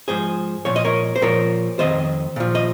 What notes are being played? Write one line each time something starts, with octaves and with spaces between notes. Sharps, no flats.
G#2 F3 G#4 C5
A#2 F3 C#5
D#5
A#4 C#5
C5
A#2 F3 A#4 C#5
F2 D#3 C5 D#5
A#2 F3
D#5